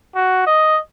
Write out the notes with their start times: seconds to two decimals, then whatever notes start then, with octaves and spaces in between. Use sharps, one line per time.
0.15 F#4
0.47 D#5